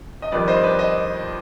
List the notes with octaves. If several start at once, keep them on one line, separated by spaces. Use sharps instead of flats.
D#5
F2 D#3 G3 B4 D5
C5 D#5
B4 D5
D#5